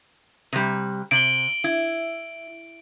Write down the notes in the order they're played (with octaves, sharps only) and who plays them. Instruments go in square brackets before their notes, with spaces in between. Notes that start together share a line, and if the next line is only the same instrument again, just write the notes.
[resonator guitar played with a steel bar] C3 G3
[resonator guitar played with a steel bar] C3 [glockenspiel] D7 F#7 G7
[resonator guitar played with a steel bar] E4